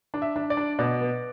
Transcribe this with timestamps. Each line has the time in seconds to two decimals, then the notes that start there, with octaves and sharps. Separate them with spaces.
0.14 D4
0.22 E5
0.36 D4
0.50 D5
0.57 D4
0.79 B2 D5
1.01 B3